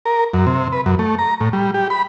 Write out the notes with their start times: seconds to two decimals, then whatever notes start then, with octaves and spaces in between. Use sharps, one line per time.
0.05 A#4
0.34 F#2
0.47 C3
0.73 B4
0.86 F#2
0.99 A3
1.18 A#5
1.40 A2
1.53 G3
1.74 G4
1.90 B5